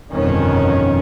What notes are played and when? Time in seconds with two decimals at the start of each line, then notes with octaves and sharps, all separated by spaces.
0.12 G1 F2 B2 D#3 C#4